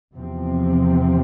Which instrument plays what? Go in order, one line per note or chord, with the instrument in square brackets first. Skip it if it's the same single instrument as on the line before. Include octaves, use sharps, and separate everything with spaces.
[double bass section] E2 C3 F3 C4